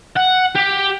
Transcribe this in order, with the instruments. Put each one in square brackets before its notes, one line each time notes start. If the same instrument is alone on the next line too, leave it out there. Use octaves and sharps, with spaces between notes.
[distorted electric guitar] F#5
G4